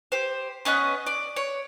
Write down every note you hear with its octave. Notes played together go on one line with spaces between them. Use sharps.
G4 C5
B3 C#4 D#5 F#5
D5
C#5